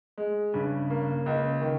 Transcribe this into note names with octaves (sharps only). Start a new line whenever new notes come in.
G#3
G2 C#3
A#3
C#2
D#3